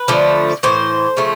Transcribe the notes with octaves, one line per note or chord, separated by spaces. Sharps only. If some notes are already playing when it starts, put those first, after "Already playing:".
Already playing: B4
D3 F3 A3
A2 E3 C5
C#3 F3 A3